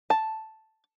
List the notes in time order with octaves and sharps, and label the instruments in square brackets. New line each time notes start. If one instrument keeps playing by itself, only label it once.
[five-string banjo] A5